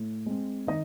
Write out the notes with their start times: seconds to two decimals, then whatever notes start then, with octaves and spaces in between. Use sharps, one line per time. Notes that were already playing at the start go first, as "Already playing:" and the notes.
Already playing: A2
0.26 G#3 C4
0.67 D#3 D#4 D#5